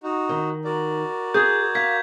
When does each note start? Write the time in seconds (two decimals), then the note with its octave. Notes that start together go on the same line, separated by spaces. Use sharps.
0.03 D#4 F#4
0.29 D#3
0.64 F#4 A#4 D5
1.34 G#4 G6 G#6
1.75 F5 G#6 B6